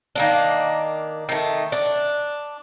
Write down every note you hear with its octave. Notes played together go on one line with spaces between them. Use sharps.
D#3 A#3 D4
D#3 A3
D4